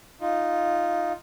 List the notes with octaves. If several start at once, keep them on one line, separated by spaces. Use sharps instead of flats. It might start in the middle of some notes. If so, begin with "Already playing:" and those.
D#4 F4